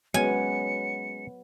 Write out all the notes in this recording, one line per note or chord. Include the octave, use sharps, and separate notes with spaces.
F#3 G#3 B3 C#4 G#5 C#7